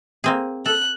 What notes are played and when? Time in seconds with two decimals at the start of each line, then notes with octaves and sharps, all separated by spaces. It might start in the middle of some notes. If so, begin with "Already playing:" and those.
0.24 A#3 C4 G#4
0.66 A4 F#6